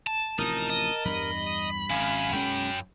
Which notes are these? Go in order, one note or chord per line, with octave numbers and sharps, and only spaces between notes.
A5
A1 C3 F3 D#4 A#4 A5
D#5
E2 G2 G3 B5
G#1 F#2 F5 G#5
B1 G#3 C#4 G5